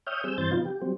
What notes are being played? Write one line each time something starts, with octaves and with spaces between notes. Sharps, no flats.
C#5 E5 G5 D#6 F6 G6
G3 C4 G#4 E6 G6
G2 E3 C4 C5 G6 A6
C3 F3 F#3 B3 D#4 F4
G4
F#3 G3 C4